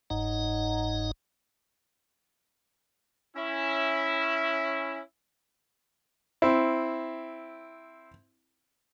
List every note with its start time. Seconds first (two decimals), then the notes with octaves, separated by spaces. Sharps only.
0.10 F#1 G#2 D#4 D#5 F#5 A#5
3.36 C#4 E4
6.42 C4 E4